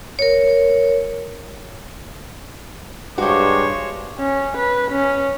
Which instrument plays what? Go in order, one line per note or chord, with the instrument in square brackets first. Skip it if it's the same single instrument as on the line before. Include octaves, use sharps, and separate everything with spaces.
[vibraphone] A#4 C#5
[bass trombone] G2 [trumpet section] G#3 D6 [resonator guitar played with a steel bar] F#4 G4 [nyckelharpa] C5 C#5
[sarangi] C#4
B4
C#4